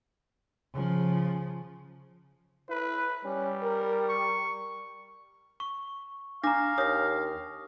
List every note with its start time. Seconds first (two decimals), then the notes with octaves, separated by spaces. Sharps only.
0.73 C#3 F3
2.69 E4 B4
3.25 G3 C#4
3.63 A#4
4.09 C#6
5.60 C#6
6.44 D4 F5 A#5 D6 A#6
6.78 D#2 C#5 D#6 A#6